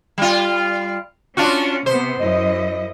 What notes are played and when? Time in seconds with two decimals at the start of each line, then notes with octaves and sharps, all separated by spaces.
0.18 G3 F4
1.37 C#4 D4 F4 F#4
1.86 C3 B3 C5
2.22 F#2 E4 D#5